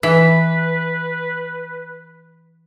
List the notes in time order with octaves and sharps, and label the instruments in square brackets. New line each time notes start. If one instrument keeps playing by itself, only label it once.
[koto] E3 [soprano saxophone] B4 [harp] B6